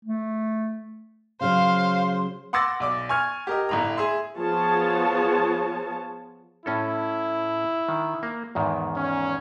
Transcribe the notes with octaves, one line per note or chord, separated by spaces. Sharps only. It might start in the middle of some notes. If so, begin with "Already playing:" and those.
A3
C#3 F#3 C5 F5
F#5 C6 D6 E6 A6 A#6
B1 D5 D6
G#5 C#6 F6 G#6
G4 A#4 D#5
G1 A2 A#5
G#4 E5 C6
F3 B3 F4 G#4 C#5 A5
A2 C#4 E4 A4
D#3
A#3
E2 G#2 D#3
C#4